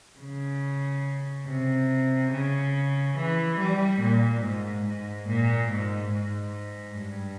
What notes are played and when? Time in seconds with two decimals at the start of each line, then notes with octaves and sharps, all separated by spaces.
0.19 C#3
1.47 C3
2.31 C#3
3.16 E3
3.59 G3
4.01 A#2
4.43 G#2
4.86 G#2
5.29 A#2
5.71 G#2
6.13 G#2
6.98 G2